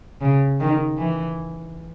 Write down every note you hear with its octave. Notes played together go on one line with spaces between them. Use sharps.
C#3
D#3
E3